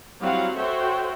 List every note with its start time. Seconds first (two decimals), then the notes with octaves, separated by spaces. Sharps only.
0.20 F#3 G3 C4 E4 F5 F#5
0.56 F#4 A4 C5 C#5 E5 G5